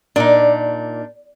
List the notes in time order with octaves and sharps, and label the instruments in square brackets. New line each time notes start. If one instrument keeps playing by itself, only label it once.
[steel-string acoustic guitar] A#2 [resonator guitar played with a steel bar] D4 D#4